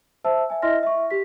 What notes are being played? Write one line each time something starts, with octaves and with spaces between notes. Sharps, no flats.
C5 E5 A5 E6
E5 G#5
E4 D#5 E5 C6 F6 A#6
E5 C#6
G4 B6